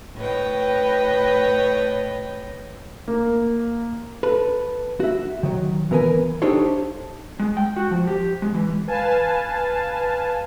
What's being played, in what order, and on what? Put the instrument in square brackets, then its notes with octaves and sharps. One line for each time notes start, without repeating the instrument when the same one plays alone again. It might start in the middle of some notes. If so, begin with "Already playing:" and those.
[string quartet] A2 B4 C#5 D#5 G5
[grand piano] A#3
[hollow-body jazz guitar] A4 B4
F#4 E5
D#3 F#3
E3 B3 A#4 B4 G#5
D4 D#4 G4 A4 C5 C#5
[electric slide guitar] G#3
G5
F#4
F3
G4
G#3
E3
[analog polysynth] B4 F5 G#5 A5